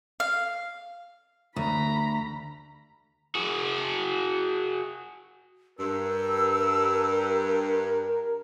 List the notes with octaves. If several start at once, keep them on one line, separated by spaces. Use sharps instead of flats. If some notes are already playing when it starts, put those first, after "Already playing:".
F5
D2 A#5 B5
F#4 G#4
G2 A#4 E6